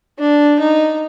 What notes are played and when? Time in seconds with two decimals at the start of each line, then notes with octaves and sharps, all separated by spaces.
0.19 D4
0.59 D#4